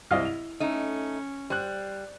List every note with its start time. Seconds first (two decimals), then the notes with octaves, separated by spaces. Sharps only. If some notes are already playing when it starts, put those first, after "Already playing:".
0.11 C2 E4 D#5 F5
0.25 F7
0.60 A3 C#4 D#4
1.50 G3 C5 F#6